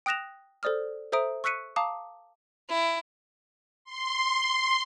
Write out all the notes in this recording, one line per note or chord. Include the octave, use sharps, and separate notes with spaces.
G5 D#6 F#6 A#6 E7 F7
A4 C5 D5 D#6 F6
A4 C5 E5 A#5 D#6 D7
C#6 E6 F#6 B6 C#7 D#7
F5 A5 A#5 D6 D#6
E4
C6